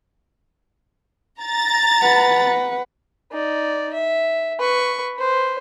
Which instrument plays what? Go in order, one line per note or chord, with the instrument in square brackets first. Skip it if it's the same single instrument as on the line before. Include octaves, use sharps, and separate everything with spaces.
[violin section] A#5 A6
[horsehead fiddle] B4 F#5
[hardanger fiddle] D#4 D5
E5
B4 C#6
B4 C5